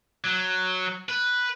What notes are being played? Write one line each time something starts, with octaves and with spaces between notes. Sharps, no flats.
F#3
B4